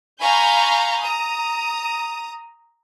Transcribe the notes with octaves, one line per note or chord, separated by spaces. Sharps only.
F5 G#5 A#5 B5 C#6 G6
A#5 D#6